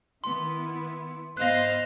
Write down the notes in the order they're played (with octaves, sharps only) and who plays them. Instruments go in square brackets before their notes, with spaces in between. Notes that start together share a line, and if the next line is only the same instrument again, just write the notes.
[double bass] D#3 [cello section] B3 E4 [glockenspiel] C6
[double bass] G#2 B3 [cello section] C5 [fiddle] D#5 F5 [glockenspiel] F#6 A#6